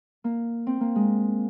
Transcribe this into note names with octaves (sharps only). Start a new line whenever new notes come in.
A#3
C4
A#3
G#3